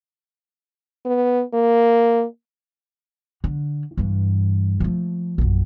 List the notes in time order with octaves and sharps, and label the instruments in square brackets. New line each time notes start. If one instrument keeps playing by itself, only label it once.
[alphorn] B3
A#3
[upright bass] D3
G2 E3
F3 A3
A#1 F#2